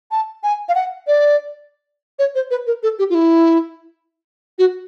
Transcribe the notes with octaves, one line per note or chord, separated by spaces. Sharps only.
A5
G#5
F5
F#5
D5
C#5
C5
B4
A#4
A4
G4
F4
E4
F#4